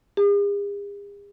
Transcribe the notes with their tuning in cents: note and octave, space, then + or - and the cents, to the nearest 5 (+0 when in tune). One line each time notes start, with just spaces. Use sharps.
G#4 -45